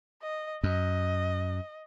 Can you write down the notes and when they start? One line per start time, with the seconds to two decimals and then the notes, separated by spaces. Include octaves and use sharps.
0.22 D#5
0.63 F#2 D#5